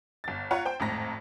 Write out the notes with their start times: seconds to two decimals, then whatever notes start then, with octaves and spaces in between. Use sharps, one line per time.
0.24 G1 A6
0.51 F4 C#5 F#5 A#5
0.65 C5 G5
0.80 G#1 F2 A2 A#5 A#6